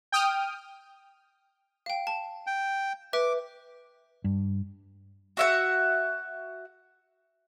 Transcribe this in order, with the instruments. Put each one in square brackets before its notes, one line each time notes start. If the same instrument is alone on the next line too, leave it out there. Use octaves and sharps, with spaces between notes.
[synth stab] G5 D#6 F6
[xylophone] F5 G5
A5
[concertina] G5
[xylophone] B4 E5 [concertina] D6
[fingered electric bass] G2
[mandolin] F#4 E5 F#5